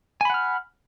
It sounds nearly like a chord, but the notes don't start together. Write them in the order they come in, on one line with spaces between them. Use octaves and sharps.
G#5 B5 F#5 F6